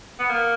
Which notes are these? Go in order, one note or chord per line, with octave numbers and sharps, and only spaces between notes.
B3
A#3